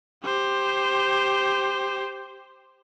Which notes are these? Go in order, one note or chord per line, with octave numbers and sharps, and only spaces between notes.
G4 C5